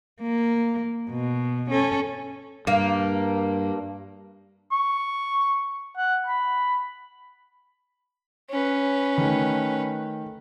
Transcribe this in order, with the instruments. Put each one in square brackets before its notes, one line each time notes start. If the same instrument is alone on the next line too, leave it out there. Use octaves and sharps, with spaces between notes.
[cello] A#3
B2
C#4 A4
[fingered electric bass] G2 [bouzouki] A#3
[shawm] C#6
F#5
B5
[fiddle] C#4 B4
[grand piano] D#3 A3